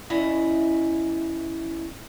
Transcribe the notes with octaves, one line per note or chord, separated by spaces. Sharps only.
E2 C#4 E4 D#5